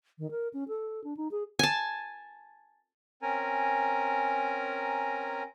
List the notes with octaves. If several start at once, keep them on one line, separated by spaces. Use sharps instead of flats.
D#3
A#4
C#4
A4
D4
D#4
G#4
G#5 A5
C4 C#4 A#4 G#5 A#5